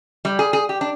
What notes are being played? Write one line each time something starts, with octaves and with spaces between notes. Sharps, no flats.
G3
G#4
G#4
G4
D4